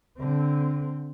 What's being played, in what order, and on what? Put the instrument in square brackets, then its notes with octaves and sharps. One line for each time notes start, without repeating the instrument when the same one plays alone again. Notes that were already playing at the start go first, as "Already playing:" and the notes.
[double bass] D3 C4